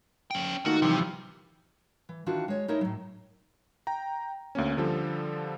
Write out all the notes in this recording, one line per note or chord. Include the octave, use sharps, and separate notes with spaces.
C#4 G5
D#3 A3 A#3 F4 F#4
C3 E3 F3 G3
E3
D#3 E3 D4 F4 F#4
G#3 C#5
A3 D#4 E4 A#4 C#5 D#5
A2 F#3
G5 A#5
D2 A#3 C#4
D3 F3 G3 A4